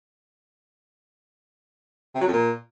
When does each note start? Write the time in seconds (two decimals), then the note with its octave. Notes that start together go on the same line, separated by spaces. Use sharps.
2.15 C3
2.21 F#3
2.27 F2
2.33 A#2